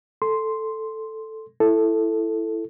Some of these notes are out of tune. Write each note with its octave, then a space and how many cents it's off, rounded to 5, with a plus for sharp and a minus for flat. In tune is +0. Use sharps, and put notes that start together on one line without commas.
A4 +0 C6 +0
E4 +10 A4 +0